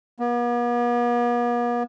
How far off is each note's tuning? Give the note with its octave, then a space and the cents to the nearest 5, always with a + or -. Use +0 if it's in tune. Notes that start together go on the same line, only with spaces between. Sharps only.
B3 -45